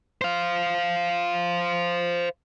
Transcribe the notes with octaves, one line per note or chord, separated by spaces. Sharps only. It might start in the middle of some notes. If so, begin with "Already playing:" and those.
C5 F5